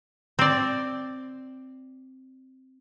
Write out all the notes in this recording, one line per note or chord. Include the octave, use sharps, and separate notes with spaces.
C4 D5